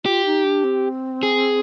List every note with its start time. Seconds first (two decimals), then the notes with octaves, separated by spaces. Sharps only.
0.05 F4 G4
0.26 D#4
0.44 D4
0.64 C4
1.23 G#4